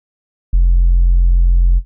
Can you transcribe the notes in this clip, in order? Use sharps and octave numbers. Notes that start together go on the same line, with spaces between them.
F1